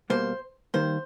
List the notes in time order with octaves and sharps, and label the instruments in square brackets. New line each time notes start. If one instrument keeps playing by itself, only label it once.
[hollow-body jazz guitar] B2 G3 A#3 [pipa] C5
[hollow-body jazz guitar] D#3 G3 A#3 [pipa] C5